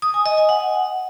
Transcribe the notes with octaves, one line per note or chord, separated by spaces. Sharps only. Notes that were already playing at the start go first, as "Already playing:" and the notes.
D#6
G#5
D#5
G#5
F#5